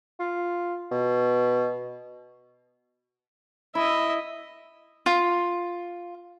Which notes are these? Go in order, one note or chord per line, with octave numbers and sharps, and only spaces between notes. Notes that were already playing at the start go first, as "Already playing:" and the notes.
F4
B2
E4 D#5 E5
F4